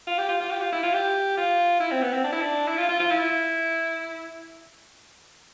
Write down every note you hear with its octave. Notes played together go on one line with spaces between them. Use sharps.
F4
G4
F4
F4
G4
F4
E4
F4
G4
F4
E4
C4
B3
C4
D4
E4
D4
E4
F4
F4
F4
E4